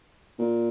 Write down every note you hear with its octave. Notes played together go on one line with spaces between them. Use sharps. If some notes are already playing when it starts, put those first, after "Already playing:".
A#2